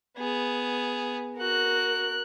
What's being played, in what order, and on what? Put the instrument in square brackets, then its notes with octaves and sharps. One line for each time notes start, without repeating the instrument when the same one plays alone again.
[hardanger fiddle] B3 G#4
[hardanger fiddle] F#4 [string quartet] A#4 F#6